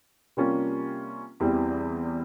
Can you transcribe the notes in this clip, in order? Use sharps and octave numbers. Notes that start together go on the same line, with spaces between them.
C3 G3 A#3 C#4 F4
E2 E3 G3 C4